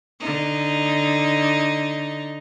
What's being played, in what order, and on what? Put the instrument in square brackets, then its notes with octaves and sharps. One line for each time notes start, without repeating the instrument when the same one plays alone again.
[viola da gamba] D3 D#4